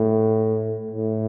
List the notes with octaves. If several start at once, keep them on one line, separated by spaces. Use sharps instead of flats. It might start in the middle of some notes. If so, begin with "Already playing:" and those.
Already playing: A2
A2